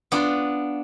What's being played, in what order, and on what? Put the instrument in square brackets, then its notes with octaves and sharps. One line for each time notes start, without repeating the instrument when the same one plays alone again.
[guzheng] B3 D4 F4